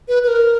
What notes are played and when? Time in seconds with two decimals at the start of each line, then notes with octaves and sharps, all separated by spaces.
0.08 B4
0.24 B4
0.28 A#4